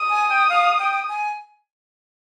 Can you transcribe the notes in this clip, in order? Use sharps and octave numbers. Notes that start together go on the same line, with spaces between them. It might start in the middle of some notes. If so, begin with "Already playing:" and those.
Already playing: D#6
G#5
G5
F5
G5
G#5